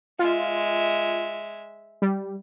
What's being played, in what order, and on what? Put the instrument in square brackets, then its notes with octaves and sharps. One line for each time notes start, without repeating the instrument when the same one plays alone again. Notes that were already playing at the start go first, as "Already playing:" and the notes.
[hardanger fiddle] G#3 E5 [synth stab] F4
[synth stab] G3